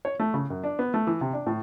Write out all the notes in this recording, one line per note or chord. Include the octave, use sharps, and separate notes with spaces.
C#5
A3
C#3
F#2
D4
B3
A3
E3
C3
D4
A2